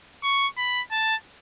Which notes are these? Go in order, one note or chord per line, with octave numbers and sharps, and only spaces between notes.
C#6
B5
A5